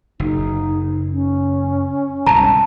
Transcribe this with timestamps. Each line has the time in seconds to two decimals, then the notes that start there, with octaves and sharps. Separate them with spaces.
0.20 F#1 D#4
1.11 C#4
2.27 C2 G#2 B2 A5 A#5